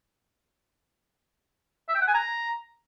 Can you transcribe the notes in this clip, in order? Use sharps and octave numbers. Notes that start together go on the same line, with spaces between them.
E5
G5
F#5
G#5
A#5